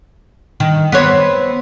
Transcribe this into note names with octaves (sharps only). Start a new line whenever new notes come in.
D#3
B3 C4 C#5